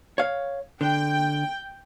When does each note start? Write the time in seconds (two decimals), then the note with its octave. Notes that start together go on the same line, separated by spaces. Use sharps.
0.18 C#5 F5
0.81 D3 G5